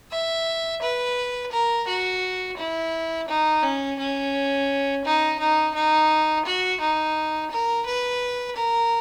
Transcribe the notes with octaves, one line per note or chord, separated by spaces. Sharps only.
E5
B4
A#4
F#4
E4
D#4
C#4
C#4
D#4
D#4
D#4
F#4
D#4
A#4
B4
A#4